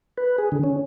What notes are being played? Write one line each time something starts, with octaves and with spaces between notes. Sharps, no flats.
B4
G#4
D3
C#4